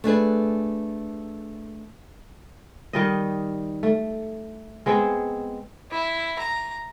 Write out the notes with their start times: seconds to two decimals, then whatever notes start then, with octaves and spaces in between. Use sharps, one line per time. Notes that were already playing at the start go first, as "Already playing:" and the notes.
0.04 A3 D4 G#4 B4
2.93 D#3 G3 D#5
3.83 A3
4.86 G#3 B3 C4 G#4
5.91 E4
6.39 A#5